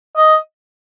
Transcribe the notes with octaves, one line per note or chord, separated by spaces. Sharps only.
D#5